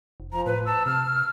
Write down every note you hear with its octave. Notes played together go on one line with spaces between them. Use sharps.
F1
F3 A#5
A2 B4
A5 E6
C3 F6